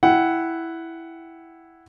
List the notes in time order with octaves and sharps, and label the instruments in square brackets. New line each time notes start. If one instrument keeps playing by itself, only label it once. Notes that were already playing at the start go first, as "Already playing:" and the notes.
[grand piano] E4 F#5 G5